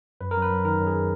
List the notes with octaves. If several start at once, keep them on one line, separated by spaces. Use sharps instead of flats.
F#2 B4
A#4
F#2
B4
F#3
D#3 A#4
F#2
G#4